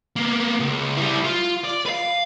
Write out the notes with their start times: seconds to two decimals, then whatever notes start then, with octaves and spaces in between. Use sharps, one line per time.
0.16 A#3 B3
0.60 C#2
0.97 G3 E4
1.24 F4
1.64 D5
1.85 B4 F5